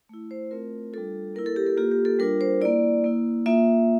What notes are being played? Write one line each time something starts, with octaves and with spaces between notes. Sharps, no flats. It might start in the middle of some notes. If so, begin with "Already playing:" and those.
A3 E4
C5
A3 C4 F4 A#4
G3 D4 F4 A4
A#3 E4 A#4
A4
G4
A4
A#3 F4 G4
G4
A4
G3 D4 F4 A#4
C5
A#3 E4 D5
A#3 E4
A#3 F4 E5